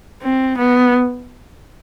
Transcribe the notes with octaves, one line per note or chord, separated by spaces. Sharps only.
C4
B3